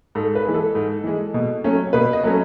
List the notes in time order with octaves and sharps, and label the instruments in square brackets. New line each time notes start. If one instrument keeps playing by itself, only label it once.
[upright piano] G#2 A4
B4
E3 G#3
A4
G#2
E3 G#3
B2
F#3 A3 C#4
B2 B4
D#5
F#3 A3 C#4